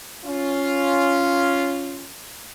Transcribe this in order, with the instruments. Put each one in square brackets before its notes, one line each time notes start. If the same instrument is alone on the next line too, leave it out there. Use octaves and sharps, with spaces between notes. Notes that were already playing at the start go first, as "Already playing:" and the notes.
[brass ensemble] C#4 F4